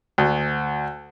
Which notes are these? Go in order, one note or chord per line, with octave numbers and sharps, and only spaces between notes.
D2